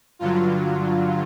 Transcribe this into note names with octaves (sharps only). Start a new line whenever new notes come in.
G2 D3 F#3 F4